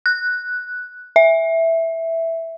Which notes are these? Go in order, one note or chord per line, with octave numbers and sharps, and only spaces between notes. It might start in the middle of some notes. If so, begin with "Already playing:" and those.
F#6
E5